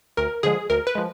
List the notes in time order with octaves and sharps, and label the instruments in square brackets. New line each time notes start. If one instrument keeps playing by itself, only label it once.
[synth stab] D2 A#4
D3 F3 G#3 G#4
D2 A#4
B4
F3 G#3